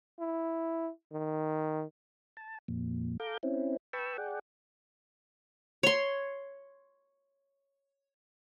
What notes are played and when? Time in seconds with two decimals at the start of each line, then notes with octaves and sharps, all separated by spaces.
0.20 E4
1.12 D#3
2.37 A5
2.68 F2 A#2
3.20 A4 F5 A#5 D6 G6
3.43 C4 C#4 E4
3.93 B4 G5 A5 B5 C#6 E6
4.18 G#4 D5 F#5 G5
5.83 C#5 C6